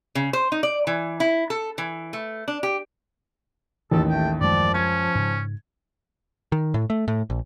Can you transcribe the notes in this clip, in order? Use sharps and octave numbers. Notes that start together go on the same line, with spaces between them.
C#3
C5
D#4
D5
E3
E4
A4
E3
A3
D4
G4
A1 D#2 E3 A4
A3 G5
F#2 F3 G#3 D5
C#4 G#6
G#2 C#3
D#3
A2
A3
A2
A#1